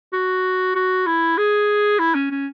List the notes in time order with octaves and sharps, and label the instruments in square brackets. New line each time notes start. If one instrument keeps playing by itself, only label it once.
[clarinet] F#4
F#4
E4
G#4
E4
C#4
C#4